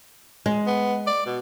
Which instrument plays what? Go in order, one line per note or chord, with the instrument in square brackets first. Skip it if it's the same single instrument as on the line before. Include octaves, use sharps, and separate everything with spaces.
[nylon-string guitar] G#3
[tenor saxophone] B3
D5
B2